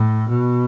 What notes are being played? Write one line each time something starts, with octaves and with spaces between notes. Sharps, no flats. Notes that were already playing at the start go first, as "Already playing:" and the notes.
Already playing: A2
B2